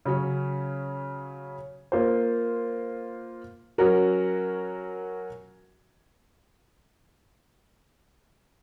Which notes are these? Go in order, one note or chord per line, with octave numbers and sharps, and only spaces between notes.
C#3 F#3 C#4
A#3 F4 C5
F#3 C#4 F#4 A#4